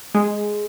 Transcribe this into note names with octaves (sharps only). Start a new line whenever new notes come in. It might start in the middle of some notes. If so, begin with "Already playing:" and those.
G#3